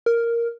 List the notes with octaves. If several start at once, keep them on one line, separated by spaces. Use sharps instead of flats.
A#4